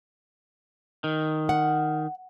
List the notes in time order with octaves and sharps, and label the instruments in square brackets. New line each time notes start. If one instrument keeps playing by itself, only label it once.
[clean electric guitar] D#3
[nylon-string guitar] F#5